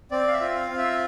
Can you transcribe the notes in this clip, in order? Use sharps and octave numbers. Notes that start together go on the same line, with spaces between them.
C4 D5
F5
E5
F4
F5
C4
E5